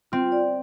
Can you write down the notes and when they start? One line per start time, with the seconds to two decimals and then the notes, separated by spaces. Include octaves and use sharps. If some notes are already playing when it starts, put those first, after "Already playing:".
0.12 C4 F4
0.32 D5